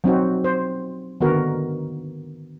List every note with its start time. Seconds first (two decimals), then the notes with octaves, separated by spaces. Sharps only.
0.04 F#3 C4 D#4 F#4
0.44 C5
1.21 D3 D#3 B3 F#4 A#4